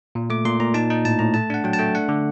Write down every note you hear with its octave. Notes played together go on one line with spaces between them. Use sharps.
A#2
A3 D6
A#2 C6
A#2 A#5
D#4 A5
D#4
A2 A5
A2 A#5
A3 A5
D4 F#5
F#3 G5
A5
A3 G5
D4 F#5
D3